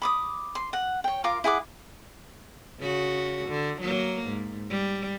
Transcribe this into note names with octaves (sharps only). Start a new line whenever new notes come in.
B5 D6 D#6
C6
F#5
C#5 G5
F4 A#4 F5 D6
E4 G#4 F#5 D6
C#3 F#4
D3
F#3 A#3
G#2
G3